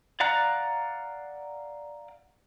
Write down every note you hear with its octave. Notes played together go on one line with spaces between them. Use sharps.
D5 F5 F#5 A#5 F#6